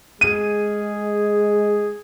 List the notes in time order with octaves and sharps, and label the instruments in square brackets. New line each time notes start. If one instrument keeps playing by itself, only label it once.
[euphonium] G#3 [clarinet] G#4 [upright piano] D#7